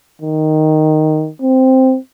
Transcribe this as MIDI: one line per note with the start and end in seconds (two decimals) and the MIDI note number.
0.21 1.29 51
1.42 1.97 60